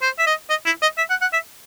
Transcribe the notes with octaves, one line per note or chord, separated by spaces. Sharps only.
C5
E5
D#5
D#5
E4
D#5
E5
F#5
F#5
E5